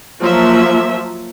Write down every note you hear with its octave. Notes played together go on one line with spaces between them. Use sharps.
F3 F#3 A#3 E5